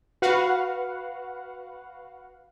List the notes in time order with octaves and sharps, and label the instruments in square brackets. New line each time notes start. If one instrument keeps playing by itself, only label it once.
[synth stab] F#4 B4 F5 F#5